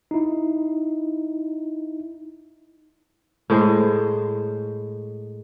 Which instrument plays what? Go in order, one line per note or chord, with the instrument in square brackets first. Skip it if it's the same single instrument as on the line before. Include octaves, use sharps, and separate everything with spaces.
[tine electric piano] D#4 E4
[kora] A2 G#3 C5